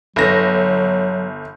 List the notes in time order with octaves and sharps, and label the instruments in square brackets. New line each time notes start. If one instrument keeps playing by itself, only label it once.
[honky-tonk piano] G1 A#6 [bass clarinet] F#3